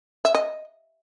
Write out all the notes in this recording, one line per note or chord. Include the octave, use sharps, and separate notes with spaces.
E5
D#5